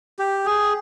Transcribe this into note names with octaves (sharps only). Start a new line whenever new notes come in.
G4
G#4